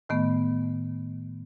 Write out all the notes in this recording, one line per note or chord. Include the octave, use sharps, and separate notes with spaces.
A2 D#3 A3 B3